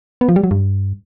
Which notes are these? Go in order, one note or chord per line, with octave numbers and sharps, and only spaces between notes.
B3
F3
G3
F#3
G2